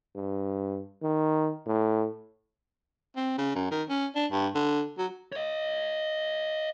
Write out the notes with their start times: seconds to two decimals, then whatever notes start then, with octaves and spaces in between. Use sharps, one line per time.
0.15 G2
1.02 D#3
1.66 A2
3.16 C4
3.38 C#3
3.55 F#2
3.71 D#3
3.89 C#4
4.15 D4
4.31 G2
4.54 D3
4.98 F#3
5.32 C#5 D#5